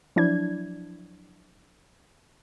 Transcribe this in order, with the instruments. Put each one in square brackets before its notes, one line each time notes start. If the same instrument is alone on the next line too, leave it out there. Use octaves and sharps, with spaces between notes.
[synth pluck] F3 F#3 D4 E4 D5 G#6